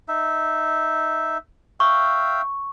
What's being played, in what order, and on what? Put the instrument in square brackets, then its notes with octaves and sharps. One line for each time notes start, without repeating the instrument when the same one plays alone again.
[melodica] D#4 E5
[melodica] E5 F5 G5 [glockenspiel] C#6